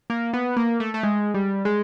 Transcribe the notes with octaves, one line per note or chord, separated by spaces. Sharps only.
A#3
B3
A#3
A3
A3
G#3
G3
G#3